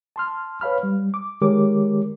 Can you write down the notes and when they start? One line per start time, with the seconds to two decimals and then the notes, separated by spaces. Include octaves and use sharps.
0.16 A5 C6 F6
0.61 B4 C#5 F5 B5 F6
0.83 G3
1.14 D6
1.41 D#3 G#3 G4 A#4 C#5 D6